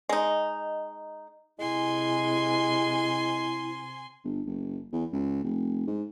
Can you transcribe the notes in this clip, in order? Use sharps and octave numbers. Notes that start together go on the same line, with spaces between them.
G#3 D#4
C3 G#3 E4 G#5 C6
G1
F#1
E2
C#2
F1
G#2